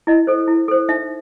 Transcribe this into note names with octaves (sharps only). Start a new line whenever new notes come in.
E4 D#5
A4 C5
E4
A4 C5
D#4 E5